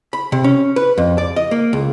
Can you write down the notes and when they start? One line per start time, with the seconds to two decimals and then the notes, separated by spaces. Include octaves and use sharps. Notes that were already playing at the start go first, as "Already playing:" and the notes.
0.13 B5
0.32 C3
0.44 C#4
0.76 B4
0.98 F2
1.18 D5
1.36 D#5
1.51 A#3
1.73 C#2